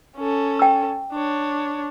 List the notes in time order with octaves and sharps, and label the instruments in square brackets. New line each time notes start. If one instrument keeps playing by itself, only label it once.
[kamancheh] C#4 A4
[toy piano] G5 E6
[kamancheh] D4 C#5